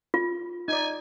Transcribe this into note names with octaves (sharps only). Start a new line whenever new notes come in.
F4
D#4 D5 G#5